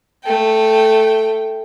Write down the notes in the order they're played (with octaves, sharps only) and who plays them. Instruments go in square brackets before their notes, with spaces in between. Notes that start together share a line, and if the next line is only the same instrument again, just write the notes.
[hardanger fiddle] A3 G5